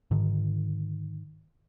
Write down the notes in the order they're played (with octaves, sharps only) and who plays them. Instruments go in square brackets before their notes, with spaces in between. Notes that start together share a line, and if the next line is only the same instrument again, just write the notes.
[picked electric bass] G#2 D3 D#3